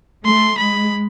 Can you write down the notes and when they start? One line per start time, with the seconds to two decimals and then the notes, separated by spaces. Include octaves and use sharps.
0.25 A3 C6
0.58 G#3 B5